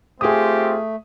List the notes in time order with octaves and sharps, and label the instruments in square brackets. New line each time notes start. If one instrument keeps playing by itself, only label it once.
[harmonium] A3 [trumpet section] C4 F4 G4 [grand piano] G#4 D#6